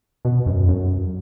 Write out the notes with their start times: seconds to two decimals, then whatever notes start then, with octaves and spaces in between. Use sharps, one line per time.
0.25 B2
0.46 F#2
0.68 F#2